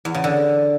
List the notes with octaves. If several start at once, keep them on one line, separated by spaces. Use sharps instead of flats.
E2
C#3
D3